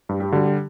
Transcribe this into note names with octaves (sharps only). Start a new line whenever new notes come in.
G2 G4
G4
D3 G3 F#4
G4